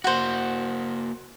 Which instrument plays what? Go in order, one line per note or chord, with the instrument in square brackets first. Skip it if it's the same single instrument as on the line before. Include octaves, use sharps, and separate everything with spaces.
[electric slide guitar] A#3 F#4 [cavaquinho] C5 F#5